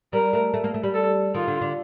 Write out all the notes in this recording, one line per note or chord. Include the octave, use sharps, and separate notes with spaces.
G3 A#4
A3
A3
A#3
A3
G3
A4
D#3 F4
D3
D3